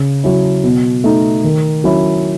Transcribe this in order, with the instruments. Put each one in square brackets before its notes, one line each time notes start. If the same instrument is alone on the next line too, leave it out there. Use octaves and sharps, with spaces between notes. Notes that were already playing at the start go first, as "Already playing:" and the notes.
Already playing: [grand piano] C#3
F#3 C#4 E4
B2
A3 D#4
D#3
F#3 C#4 E4